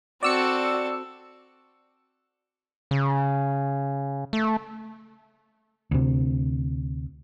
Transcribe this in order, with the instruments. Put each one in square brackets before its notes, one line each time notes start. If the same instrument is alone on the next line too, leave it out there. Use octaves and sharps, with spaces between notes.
[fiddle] C4 A4 [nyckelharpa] F#4 [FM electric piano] D5 E6 C#7
[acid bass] C#3
A3
[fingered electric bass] D2 C3